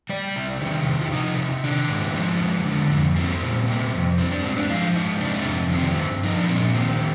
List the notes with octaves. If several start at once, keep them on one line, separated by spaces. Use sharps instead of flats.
G3 D5
C3
D#3 G4
C3
F4
F3 D#4
C3
D#3 D4
G#2
F3
G#2
D3
F2
G3 C4
A#2
C3 C4
F2
G3 C4
D4
G#2 C4
D4
F3 F4
G#2 D#4
C3 D4
F2
D#3 C4
G2
F3 D#4
D4
A#2 C4
D4
D#3 C4